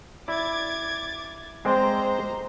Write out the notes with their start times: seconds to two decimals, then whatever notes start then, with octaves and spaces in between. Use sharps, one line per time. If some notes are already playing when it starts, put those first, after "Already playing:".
0.28 E4 D5 D6 G#6 A6
1.65 G#3 C4 C5 D5 A#5